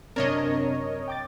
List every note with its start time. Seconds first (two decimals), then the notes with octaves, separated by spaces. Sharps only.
0.16 F#2 C3 C4 D4 A#4 C#5 D#5
1.07 G5 D6 A6